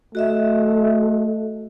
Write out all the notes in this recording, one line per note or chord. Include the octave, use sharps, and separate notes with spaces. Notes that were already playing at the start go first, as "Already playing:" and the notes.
A3 F#4 D#5 E5